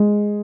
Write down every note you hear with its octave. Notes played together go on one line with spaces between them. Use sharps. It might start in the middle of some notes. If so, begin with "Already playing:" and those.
Already playing: G#3